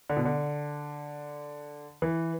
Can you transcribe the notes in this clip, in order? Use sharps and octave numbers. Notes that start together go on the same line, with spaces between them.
D3
B2
D3
E3